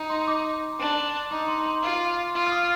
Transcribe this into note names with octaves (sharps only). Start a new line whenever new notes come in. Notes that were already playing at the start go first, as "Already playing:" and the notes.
Already playing: D#4
C6
D6
D4
D#4 D6
C6
C6
F4
F4
F6
D#6